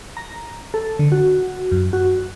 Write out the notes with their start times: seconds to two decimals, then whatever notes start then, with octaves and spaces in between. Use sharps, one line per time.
0.17 A#5
0.74 A4
0.99 D3
1.12 F#4
1.71 F#2
1.93 F#4